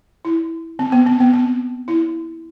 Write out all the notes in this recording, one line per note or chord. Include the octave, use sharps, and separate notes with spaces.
E4
C4
B3
C4
B3
C4
E4